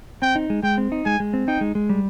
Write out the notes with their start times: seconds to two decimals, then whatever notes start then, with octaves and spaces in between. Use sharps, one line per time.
0.22 C4 G5
0.36 D#4
0.50 G#3
0.63 G#3 G5
0.78 C4
0.92 D#4
1.05 G#3 G#5
1.20 G#3
1.34 C4
1.47 D#4 G5
1.61 G#3
1.75 G#3
1.89 G3